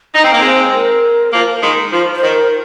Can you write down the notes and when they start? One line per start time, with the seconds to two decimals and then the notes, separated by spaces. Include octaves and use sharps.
0.15 D#4 D#5
0.23 C4
0.32 A#3
0.40 G#3 C4 C5
0.74 A#4
1.33 F3 A#3
1.63 D#3 G#3
1.92 F3 C5
2.13 C5
2.23 D#3
2.33 A#4